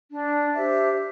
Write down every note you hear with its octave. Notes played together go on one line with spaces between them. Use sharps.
D4
G4 C5 E5